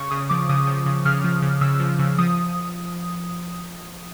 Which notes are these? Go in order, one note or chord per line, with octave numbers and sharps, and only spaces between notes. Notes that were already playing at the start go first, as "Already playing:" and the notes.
Already playing: C#3 C#6
C#3 D#6
F3 D6
C#3 D#6
F3
C#3
C#3 F6
F3
C#3
C#3 E6
F3
C#3
F3 D#6